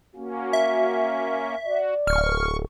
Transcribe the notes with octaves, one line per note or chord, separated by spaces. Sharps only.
A#3 C#4 F#4
E5
F#4 D5
D1 C#6 F6